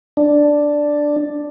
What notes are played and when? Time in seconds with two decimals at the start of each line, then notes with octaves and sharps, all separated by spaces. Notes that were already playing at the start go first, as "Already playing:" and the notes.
0.17 D4